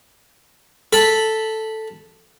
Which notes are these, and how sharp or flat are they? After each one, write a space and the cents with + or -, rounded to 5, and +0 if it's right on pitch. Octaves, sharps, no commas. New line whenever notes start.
A4 +0 B5 -5